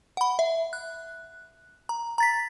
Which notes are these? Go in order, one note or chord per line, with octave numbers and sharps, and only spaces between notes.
F#5 B5
E5
F#6
A#5
A#5 A6 B6